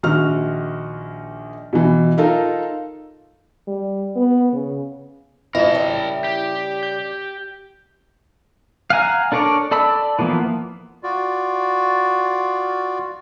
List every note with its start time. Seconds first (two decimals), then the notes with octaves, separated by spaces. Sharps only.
0.03 A#1 D#3 F#4 F6
1.73 B2 E3
2.18 D#4 F4 A4 A#4
3.67 G3
4.16 B3
4.53 C#3
5.55 F2 G#2 E4 A#4 A5
5.71 C#3 G3
6.24 G4
6.83 G6
8.90 F5 F#5 G#5 A#5
9.32 D4 A4 A#4 C#5 D5
9.71 A4 D5 A5 B5 E6
10.19 E3 F3 A#3 B3
11.03 F4 F#4 D5